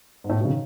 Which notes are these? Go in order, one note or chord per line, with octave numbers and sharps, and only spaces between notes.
G#2
A2
B2
C#3
D#3